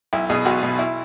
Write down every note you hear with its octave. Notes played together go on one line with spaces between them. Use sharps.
B1 E4
B2 G#4
B1 F#4
B2
E4